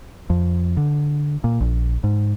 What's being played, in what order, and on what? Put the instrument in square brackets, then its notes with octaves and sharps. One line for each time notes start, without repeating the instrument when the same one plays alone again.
[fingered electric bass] F2
D3
A#2
A#1
G#2